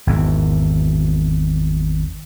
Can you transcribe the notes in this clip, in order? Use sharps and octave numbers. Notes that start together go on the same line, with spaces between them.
G#1 E2